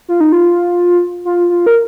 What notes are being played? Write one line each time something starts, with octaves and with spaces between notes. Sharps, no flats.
F4
D#4
F4
F4
F4
A#4